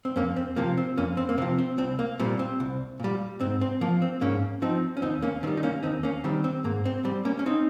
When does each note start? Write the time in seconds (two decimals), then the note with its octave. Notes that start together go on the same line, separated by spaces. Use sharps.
0.05 C4
0.16 F2 A#3 C#4
0.36 C4
0.56 C3 F3 A#3
0.77 C4
0.97 F2 A#3 C#4
1.17 C4
1.29 A#3
1.38 C3 C4
1.42 F3
1.58 C4
1.78 C2 C4
1.99 A#3
2.19 A#2 G3 C4
2.39 C4
2.60 C2
3.00 A#2 G3
3.41 G#2 C4
3.61 C4
3.81 F3 A#3
4.02 C4
4.21 G#2 A#3 C#4
4.62 F3 C4 D#4
4.97 C#4
5.02 D#2 C4 D#4
5.22 A#3 C#4
5.43 D#3 C4
5.47 G3
5.57 D#4
5.63 A#3 C#4
5.83 D#2 C4 D#4
6.03 A#3 C#4
6.24 D#3 G3 C4
6.44 C4
6.64 G#2 A#3
6.86 C4
7.05 G3 C4
7.25 A#3 C#4
7.39 C#4
7.46 C4 D#4